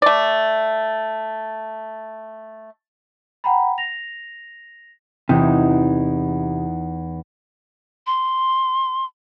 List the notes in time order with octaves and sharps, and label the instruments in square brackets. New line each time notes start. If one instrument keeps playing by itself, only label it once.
[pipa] A3 D5
[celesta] F#5 G5 A#5 B5
A#6 F7
[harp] E2 E3 D#4 [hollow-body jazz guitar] C3
[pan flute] C6